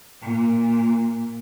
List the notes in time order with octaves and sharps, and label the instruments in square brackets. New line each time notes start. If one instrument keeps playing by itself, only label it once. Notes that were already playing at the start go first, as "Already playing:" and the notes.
[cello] A#2